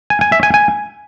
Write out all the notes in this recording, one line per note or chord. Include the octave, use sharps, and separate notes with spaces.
G#5
G#5
E5
G#5
G#5